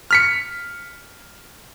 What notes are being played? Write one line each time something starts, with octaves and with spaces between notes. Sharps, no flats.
F6 B6 C#7